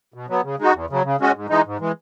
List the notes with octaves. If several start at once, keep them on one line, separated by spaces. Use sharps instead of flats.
B2
F#3 B3
C#3
G#3 D#4 F#4
E2
C#3 F#3
C#3
G#3 C#4 F#4
G#2
E3 G#3 D#4
G#2
E3 G#3